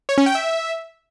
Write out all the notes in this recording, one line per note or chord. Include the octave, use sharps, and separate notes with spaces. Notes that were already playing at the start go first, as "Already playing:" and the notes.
C#5
C#4
G5
E5